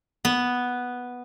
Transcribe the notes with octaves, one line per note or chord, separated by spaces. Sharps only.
B3